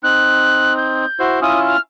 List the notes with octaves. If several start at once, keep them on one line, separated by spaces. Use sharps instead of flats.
C4 D#4 F#6
G6
E4 F#4 C5
C#4 E4 F4 D#6
F6